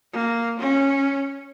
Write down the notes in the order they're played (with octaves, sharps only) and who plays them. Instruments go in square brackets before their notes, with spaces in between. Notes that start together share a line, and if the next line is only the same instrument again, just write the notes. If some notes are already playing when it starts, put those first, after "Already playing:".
[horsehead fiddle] A#3
C#4